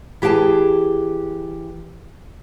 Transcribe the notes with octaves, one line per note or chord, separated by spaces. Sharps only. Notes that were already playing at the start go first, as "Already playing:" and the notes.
E3 G4 G#4 F#5 A5